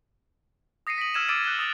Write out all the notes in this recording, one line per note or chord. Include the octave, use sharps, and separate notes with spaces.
D#6 A#6 C7 C#7 D#7
B6 D7 F#7
E6 F6 G#6 D#7 E7
D6 E6 F6 A6 D7 D#7
F#6 A6 G7
D#6 F#6 A6 F7